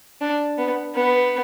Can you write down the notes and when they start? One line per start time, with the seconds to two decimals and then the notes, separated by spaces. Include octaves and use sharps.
0.21 D4
0.58 B3
0.94 B3